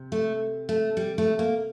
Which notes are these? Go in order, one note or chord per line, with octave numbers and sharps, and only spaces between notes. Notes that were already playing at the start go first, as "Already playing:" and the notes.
Already playing: C3
A3
A3
G3
A3
A#3